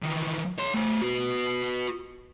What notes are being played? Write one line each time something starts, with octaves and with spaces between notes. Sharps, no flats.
D#3 E3
C#5 C6
A3 C5
F#4 B4